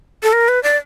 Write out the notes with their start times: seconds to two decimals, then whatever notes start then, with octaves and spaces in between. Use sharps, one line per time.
0.23 A4
0.33 A#4
0.48 B4
0.63 D5